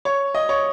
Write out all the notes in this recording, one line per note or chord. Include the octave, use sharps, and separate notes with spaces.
C#5
D#5
C#5